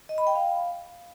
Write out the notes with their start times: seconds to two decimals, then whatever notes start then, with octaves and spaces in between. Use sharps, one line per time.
0.09 D#5
0.18 B5
0.27 G5
0.36 F5